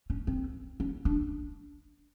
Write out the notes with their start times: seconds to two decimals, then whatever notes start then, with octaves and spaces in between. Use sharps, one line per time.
0.10 C#4
0.27 C4
0.80 C#4
1.05 D4